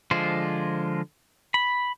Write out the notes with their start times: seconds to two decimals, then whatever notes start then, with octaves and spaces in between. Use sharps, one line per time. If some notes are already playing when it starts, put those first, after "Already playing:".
0.11 D3 F3 G#3 F4 C5
1.54 B5